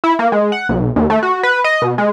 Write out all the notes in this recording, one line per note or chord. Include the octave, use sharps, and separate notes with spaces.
E4
A#3
G#3
F#5
B1
D#2
A3
F#4
B4
D#5
B2
G#3